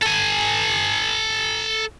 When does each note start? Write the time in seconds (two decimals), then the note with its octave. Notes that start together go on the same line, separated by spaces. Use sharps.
0.02 A4 G#5